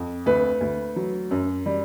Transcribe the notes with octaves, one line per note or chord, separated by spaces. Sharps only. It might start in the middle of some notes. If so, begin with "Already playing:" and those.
Already playing: F2
D2 B4
D2
F#3
F#2
G3